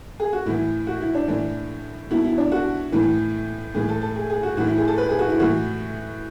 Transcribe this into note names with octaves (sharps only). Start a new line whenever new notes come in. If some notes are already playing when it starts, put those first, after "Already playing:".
G#4
F#4
A2 E3 E4
F#4
E4
D4
A2 E3 D4
B2 E4
E4
D4
F#4
A2 E3
A2 E3 G#4
A4
A4
G#4
G#4
F#4
A2 E3 F#4
E4
G#4
A4
B4
G#4
F#4
E4
A2 E3 F#4